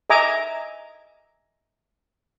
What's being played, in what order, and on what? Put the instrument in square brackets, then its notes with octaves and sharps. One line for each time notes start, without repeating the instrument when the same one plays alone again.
[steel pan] D#5 E5 G#5 A#5 D6